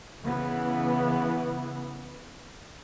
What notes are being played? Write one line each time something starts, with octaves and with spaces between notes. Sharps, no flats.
C#3 E3 B3